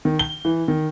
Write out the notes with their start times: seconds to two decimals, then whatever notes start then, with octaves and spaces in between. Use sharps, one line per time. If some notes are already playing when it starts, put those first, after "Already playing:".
0.05 D#3
0.19 G7
0.45 E3
0.68 D#3